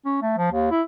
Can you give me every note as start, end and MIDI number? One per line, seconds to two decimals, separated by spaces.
0.05 0.18 61
0.22 0.35 57
0.38 0.50 53
0.52 0.69 39
0.71 0.82 64